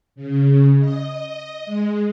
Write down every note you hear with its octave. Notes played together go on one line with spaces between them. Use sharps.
C#3
D#5
G#3